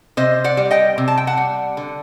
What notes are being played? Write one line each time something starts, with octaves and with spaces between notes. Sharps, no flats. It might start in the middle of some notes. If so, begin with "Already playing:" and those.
C3 C5 D#5
D5 F#5
G3
D#5 G5
C3
A5
G5
F#5 A5
G3
D3